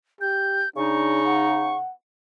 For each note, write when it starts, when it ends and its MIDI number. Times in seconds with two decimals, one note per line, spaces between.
0.21 0.65 67
0.21 0.69 91
0.76 1.79 49
0.76 1.22 62
0.76 1.79 63
0.76 1.77 85
1.26 1.92 78